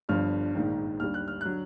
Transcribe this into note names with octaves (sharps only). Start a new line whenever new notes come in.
G1 G2 D3 F3 F6
A#1 G#2 D#3
D#2 D3 G3 F6
F#6
F6
D3 F#3 F#6